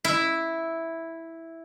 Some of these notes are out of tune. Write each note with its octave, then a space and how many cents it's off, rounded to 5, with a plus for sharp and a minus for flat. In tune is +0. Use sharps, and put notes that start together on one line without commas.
E4 -5